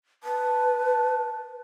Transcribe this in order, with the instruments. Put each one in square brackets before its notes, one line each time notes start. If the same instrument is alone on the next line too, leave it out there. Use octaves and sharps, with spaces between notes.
[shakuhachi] B4 [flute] A5